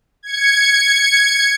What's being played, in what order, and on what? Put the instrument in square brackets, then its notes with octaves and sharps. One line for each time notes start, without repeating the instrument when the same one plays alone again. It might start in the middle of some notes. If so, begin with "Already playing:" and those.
[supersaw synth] G#6 C#7